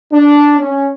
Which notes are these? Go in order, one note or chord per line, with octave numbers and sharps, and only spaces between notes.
D4
C#4